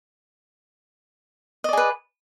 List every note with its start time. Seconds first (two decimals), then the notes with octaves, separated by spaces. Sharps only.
1.64 D#5
1.69 D5
1.73 G#4
1.77 B4